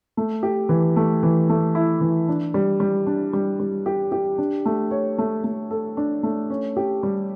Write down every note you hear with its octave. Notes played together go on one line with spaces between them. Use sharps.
A3
G4
E3
A3
E3
A3
E4
E3
D4
G3
G3
D4
G3
G3
G4
G4
D4
A3
C#5
A3
A3
A4
D4
A3
C#4
G4
G3